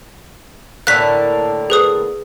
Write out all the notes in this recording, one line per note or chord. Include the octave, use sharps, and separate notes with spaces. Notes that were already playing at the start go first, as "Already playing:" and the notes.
A2 D3 A#3 F#6 B6
G#4 B4 D#6